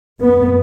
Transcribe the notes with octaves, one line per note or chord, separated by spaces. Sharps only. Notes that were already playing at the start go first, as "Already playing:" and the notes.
F#2 B3